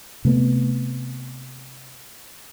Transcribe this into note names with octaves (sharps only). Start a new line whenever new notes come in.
C3 A3 B3